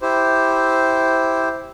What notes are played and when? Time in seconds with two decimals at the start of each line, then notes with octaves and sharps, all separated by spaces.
0.02 E4 G4 C5